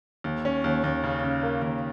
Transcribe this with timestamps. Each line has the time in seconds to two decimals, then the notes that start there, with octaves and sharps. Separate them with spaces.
0.24 D#2
0.45 C#4
0.64 D#2
0.84 D#2
1.04 C#3
1.23 C#3
1.43 A#3
1.62 D#2